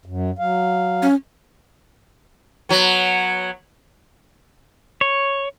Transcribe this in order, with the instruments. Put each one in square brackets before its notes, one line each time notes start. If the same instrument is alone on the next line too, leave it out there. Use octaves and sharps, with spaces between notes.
[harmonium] F#2
F#3 F5
[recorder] C#4
[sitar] F#3 B3
[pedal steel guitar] C#5